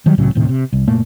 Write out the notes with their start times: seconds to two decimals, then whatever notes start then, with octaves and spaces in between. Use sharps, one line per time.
0.06 D#3 F#3 G3
0.18 C2 A2 C#3 F#3
0.35 D#1 A2 C3 D#3
0.49 C3
0.73 C2
0.88 F#1 A#2 A3 A#3